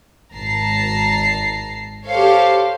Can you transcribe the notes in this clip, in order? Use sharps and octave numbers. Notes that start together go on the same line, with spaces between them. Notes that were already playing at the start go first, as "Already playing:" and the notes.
G#1 A5 A#5 C7
G4 A4 C5 C#5 F5